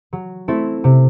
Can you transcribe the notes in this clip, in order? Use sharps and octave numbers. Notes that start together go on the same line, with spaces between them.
F#3
A3 C4 E4 A4
C3